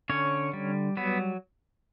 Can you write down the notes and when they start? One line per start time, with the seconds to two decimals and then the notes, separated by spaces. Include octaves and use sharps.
0.10 D3 C#4 C#5
0.53 G3
0.97 F#3 B3 B4